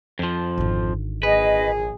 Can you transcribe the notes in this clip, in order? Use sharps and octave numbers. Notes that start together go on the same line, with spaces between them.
F2 F3
G#1 D3
A#1 G#4 B4 D#5